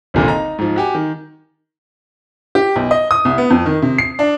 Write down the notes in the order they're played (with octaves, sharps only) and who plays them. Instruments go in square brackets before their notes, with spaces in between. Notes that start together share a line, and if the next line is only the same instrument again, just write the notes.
[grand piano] G#1 A#2 D3
D#4 A#5
G#2 F3
F#4 G4 G#5
D#3
[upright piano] G4
B1
D#5
D#6
C2
B3
F2
D#3
C3
C7
D4